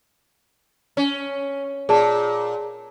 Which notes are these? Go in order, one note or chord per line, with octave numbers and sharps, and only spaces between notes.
C#4
A#2 G#4 D5 A5